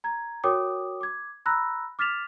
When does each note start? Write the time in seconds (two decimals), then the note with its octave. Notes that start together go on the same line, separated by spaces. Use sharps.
0.04 A#5 G#6
0.44 F#4 A#4 C#5 G5 D6 D#6
1.01 D6 G#6
1.46 A#5 B5 E6 F#6 A#6
1.99 D6 F6 A6 B6 E7 F7